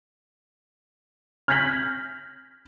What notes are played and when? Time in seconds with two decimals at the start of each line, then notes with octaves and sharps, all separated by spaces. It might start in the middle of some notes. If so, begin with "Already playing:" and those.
1.48 F6 G6 G#6 A#6 B6 F#7